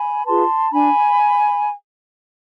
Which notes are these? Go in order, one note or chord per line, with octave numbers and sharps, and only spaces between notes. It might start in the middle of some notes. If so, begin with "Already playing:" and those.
Already playing: G#5 B5
F4 G#4 B4 A5 C6
D4 G#5 B5